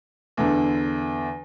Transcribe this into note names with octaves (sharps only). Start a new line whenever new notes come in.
E2 D3